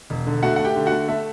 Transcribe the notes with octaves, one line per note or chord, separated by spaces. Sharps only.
E1
D3
A3 F#4 F#5
A3 F#5
G4 G5
D3
F#4 F#5
A3
A3 E5